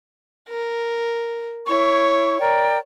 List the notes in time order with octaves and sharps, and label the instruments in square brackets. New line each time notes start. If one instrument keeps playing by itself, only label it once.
[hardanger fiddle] A#4
[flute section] E4 C#6 [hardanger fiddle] C#5
[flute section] A#4 D5 G5